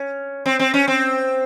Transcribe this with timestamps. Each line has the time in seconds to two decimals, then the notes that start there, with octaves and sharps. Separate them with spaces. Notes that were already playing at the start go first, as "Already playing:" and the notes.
Already playing: C#4
0.46 C4
0.59 C4
0.74 C#4
0.88 C4